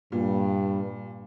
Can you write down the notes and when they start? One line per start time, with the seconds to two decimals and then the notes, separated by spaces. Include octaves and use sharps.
0.12 G2 A#2